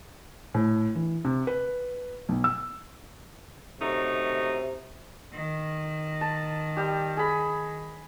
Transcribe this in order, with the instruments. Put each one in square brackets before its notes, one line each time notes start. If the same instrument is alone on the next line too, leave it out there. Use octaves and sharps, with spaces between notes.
[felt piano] A2
E3
C3
B4
B1
E6
[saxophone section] F#2 A3 D#4 [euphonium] C3
[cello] D#3
[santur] A5
G3 G4
G#4 B5